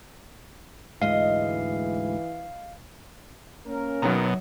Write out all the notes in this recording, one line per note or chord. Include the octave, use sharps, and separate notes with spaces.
D2 G#2 E3 G#3 D#5 F5
A#3 C#4 A#4
F#2 B2 D#3 F#3 A#5